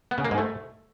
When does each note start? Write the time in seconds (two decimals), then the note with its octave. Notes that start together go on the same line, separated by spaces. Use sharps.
0.11 B3
0.18 C#3
0.25 A#3
0.31 G#2
0.38 A3